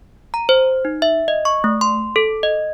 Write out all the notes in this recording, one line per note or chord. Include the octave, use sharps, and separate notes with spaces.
A#5
C5
D#4
E5
D#5
C#6
A3
C6
A4
D#5